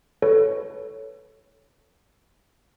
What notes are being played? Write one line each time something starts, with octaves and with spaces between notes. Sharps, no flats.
A4 B4 C#5